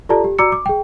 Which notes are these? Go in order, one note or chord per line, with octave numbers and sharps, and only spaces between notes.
F4 G4 A4 D5 A5 A#5
G4
F#4 D5 A#5 D6 E6 C#7
D6
G#4 G5